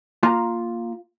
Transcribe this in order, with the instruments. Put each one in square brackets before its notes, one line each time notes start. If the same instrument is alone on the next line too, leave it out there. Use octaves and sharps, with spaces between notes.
[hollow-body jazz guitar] A#3 F4 A#5